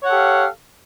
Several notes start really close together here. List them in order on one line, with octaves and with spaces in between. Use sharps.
C#5 F#5 A4 G4 F5